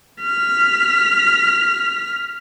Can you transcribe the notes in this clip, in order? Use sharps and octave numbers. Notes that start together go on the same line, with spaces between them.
F6 B6